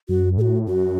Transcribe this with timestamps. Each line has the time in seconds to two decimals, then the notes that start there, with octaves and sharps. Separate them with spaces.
0.09 F#2 F#4
0.37 A2 A4
0.41 F#4
0.67 F#2 F#4